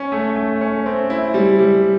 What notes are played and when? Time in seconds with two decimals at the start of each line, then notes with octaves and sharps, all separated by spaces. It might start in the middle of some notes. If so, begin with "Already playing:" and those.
Already playing: C#4
0.12 A3
0.36 A3
0.61 C#4
0.86 C4
1.10 E4
1.34 G3
1.59 G3